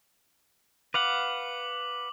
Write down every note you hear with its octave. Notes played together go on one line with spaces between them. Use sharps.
B4 F5 F#5 D6 F#7